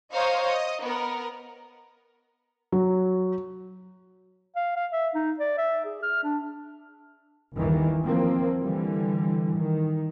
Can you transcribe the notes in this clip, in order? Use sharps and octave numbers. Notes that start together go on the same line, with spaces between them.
C5 C#5 D#5 F5 A#5 C#6
D#5
B3 A#4
F#3
F5
F5
E5
D#4
D5
E5
G#4
F6
D4
G1 D#2 D#3 E3
F3 A#3 C4
D3 E3 G3
D#3